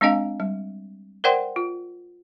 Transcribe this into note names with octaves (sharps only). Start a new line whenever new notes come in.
G#3 C4 D4 D#5 F5 G#5
G3
A#4 C5 D5 F#5 G5 C6
F4